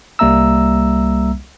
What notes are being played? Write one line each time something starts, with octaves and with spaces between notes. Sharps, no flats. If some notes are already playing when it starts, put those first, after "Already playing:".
C2 G3 A#3 E5 A#5 E6